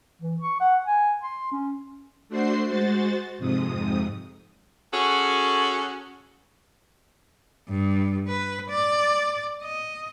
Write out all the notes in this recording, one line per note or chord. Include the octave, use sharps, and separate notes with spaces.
E3
C#6
F#5
G#5
C6
C#4
A3 D4 F#4 C5 C6 C7
G#3 F#4 C5 A6
F2 G#2 C3 D#6
C#4 F#4 G#4 A4
G2
B4
D5
D#5